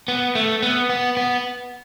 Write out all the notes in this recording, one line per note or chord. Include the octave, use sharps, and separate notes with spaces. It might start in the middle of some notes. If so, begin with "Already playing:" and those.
B3
A3
B3
B3
B3